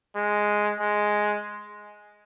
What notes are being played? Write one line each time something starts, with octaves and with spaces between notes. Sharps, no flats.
G#3
G#3